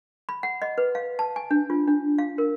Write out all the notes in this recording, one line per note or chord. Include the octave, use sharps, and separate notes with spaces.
B5
F#5
D#5
B4
F5
A5
G#5
D4
F4
D4
F5
A#4